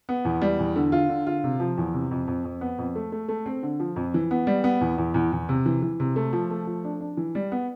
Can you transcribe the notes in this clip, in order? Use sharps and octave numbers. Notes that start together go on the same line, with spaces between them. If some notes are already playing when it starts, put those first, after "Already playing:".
B3
E2
G3
E2
D3
F4
D3
F4
C3
F3
E2
C3
F2
F2
F2
B3
F2
A3
A3
A3
C4
D3
F3
F2
E3
B3
G3
B3
E2
E2
E2
E2
C3
E3
E3
C3
A3
F3
A3
F3
D4
D4
E3
G3
B3